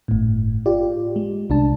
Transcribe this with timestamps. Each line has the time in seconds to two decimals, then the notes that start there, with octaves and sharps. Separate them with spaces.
0.08 G1 A2
0.66 F4 G4 D5
1.16 G#3
1.50 C2 D4 A5